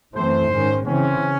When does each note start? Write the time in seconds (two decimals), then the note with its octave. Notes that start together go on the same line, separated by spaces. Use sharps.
0.15 F#2 E3 A3 C4 C5
0.51 G#2 D#3 G#3 C#4
0.86 C#3 E3 C4 C#4